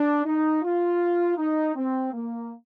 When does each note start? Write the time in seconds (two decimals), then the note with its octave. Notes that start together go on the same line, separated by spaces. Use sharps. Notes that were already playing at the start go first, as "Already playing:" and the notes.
Already playing: D4
0.25 D#4
0.62 F4
1.37 D#4
1.75 C4
2.12 A#3